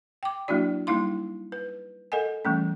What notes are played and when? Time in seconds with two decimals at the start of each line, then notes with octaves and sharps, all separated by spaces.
0.23 G5 D6
0.48 F#3 A#3 D4 E4 F#4 D5
0.87 G3 A#3 D#4 E4 F5 C6
1.52 B4
2.12 A4 A#4 D#5 F#5 G#5
2.45 E3 G3 A3 C#4